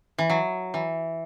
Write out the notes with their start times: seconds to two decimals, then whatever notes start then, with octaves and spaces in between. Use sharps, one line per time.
0.18 E3
0.30 F#3
0.74 E3